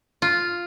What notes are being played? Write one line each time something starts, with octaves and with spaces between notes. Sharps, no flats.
F4